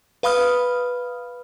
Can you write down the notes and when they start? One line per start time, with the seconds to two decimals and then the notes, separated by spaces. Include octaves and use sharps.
0.23 B4 F5 B5 D#6 F6